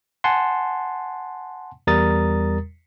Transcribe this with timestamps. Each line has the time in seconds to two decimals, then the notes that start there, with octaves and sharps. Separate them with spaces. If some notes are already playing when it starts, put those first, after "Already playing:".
0.24 F#5 G#5 A5 C6
1.87 E2 G3 A#4 A#5 D#6 A6